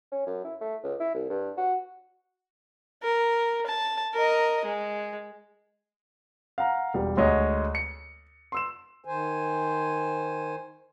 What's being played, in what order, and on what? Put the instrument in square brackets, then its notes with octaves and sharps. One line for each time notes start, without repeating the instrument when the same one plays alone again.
[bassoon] C#4
F#2
E4
A3
C#2
E4
C2
G2
F#4
[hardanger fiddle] A#4
A5
A#4 D#5
G#3
[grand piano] F5 F#5 A#5
E1 G3
D2 G#3 C#5 D#5
C#7
C6 E6 E7
[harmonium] D#3 C5 G#5